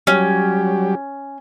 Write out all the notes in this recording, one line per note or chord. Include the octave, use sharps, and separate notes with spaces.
F#3 G3 C#4 G4